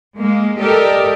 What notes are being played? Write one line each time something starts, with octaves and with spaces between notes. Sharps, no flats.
G#3 A#3
G4 A4 A#4 D5 D#5